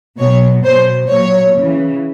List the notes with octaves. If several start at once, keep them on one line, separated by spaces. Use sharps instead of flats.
B2 F#3 C#5
B2 F#3 C5
A#2 F#3 C#5
C#3 E3